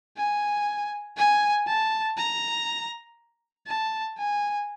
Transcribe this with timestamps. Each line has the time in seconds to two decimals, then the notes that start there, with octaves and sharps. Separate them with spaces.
0.18 G#5
1.17 G#5
1.67 A5
2.17 A#5
3.67 A5
4.18 G#5